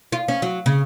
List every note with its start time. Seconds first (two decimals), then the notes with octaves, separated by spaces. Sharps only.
0.12 F4
0.28 C#4
0.42 F#3
0.66 C#3